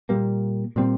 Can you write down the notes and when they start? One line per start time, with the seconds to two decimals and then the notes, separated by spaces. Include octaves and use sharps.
0.09 A#2 G3 A#3
0.76 A#2 G3 C4